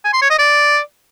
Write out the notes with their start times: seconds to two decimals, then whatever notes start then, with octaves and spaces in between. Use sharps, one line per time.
0.05 G#5
0.13 C6
0.22 C#5
0.30 D#5
0.39 D5